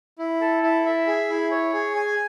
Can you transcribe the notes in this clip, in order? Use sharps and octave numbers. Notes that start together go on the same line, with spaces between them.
E4
A4
E4
E5
G#4
E4
C#5
G#4
G#5